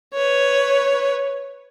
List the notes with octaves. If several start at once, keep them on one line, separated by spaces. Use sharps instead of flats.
B4 C#5